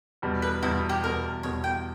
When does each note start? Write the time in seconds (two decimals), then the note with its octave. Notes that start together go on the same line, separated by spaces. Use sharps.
0.22 E2 B2 G3
0.42 B4
0.63 E2 B2 G3 E4
0.89 G4
1.03 E2 B2 G3 A#4
1.43 E2 B2 G3 C#5
1.64 G5